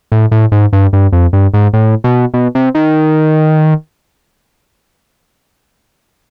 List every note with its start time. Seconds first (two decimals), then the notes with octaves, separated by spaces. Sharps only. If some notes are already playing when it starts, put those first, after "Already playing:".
0.12 A2
0.31 A2
0.52 G#2
0.73 G2
0.93 G2
1.12 F2
1.33 G2
1.54 G#2
1.73 A2
2.04 B2
2.34 B2
2.55 C3
2.75 D#3